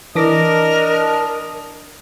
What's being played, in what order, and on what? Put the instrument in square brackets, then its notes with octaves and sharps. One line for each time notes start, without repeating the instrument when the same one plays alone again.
[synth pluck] E3 D6 A#6 [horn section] D4 D#5 [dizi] A#4